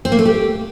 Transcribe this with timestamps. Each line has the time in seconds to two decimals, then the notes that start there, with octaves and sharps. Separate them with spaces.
0.05 C4
0.12 A#3
0.19 A3
0.25 G4